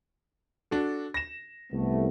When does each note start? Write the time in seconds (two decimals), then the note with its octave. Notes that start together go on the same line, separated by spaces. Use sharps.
0.71 D4 F#4 A4
1.14 A#6 E7
1.72 C2 A3 B3